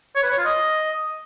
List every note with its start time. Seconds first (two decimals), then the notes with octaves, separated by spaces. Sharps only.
0.15 C#5
0.23 B4
0.30 C#5
0.38 F4
0.45 D#5